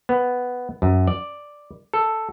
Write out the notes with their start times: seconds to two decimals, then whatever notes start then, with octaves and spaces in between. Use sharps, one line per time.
0.09 B3
0.82 F#2
1.07 D5
1.94 A4